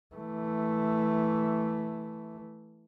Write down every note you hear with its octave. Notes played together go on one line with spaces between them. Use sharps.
E3 A3